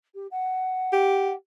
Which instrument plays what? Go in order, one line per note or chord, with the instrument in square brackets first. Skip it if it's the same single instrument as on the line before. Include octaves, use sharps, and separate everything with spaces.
[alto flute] G4
F#5
[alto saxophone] G4